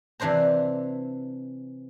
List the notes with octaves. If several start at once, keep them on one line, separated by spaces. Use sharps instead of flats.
C3 E3 D4 C5 A#5